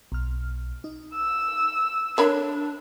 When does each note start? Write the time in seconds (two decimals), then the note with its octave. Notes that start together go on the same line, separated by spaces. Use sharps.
0.12 B1 F6
0.84 D#4
1.14 E6
2.18 D4 A4 A#4 C#5 B5